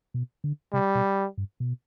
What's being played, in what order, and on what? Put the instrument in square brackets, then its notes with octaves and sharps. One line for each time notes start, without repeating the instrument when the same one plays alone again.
[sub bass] B2
D3
[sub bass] C3 [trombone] G3
[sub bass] B2
G2
B2